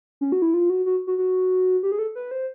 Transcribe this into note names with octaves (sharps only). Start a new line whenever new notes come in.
C#4
F#4
E4
F4
F#4
F#4
F#4
F#4
G4
G#4
A4
B4
C5